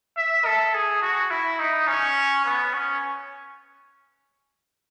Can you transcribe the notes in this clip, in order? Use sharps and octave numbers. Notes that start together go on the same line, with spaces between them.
E5
A4
G#4
F#4
E4
D#4
C#4
B3
C#4